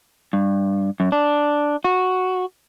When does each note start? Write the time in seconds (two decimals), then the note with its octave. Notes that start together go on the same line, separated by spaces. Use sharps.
0.33 G2
1.00 F#2
1.12 D4
1.84 F#4